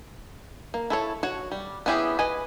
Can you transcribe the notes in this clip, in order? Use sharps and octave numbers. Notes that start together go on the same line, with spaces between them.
A#3
E4 A4 C#5
F#4 C#5
G3
B3 C#4 E4 G4 G#4
B4 D#5 G#5